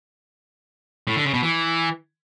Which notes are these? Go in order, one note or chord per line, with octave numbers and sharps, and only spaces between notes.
A2
D3
C#3
B2
E3